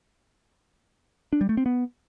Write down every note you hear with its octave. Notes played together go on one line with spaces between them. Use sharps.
D4
G3
A3
C4
B3